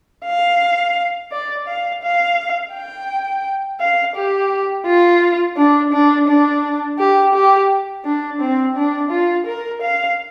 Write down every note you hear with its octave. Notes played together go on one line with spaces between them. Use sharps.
F5
D5
F5
F5
G5
F5
G4
F4
D4
D4
D4
G4
G4
D4
C4
D4
F4
A#4
F5